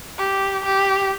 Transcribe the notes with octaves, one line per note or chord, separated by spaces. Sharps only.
G4
G4